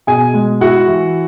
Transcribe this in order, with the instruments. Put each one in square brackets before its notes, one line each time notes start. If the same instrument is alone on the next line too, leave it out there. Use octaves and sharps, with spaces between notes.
[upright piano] B2 G#4 G#5
G#3
E4 F#4 F#5
E3